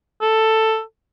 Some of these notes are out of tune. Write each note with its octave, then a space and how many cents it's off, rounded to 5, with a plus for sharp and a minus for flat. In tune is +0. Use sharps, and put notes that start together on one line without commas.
A4 +5